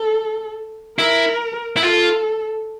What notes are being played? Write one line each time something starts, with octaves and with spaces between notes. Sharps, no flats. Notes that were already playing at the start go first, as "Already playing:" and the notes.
Already playing: A4
E4 A#4
E4
F4 A4